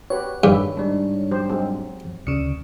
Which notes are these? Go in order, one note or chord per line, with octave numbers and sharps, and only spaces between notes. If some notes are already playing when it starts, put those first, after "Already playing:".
F#4 G4 B4 C#5
G2 D#3 A3 E4
G#2 G3 G#3 D4
F#3 G4 C5
F#3 G#3 C4
D2 C#3 C#7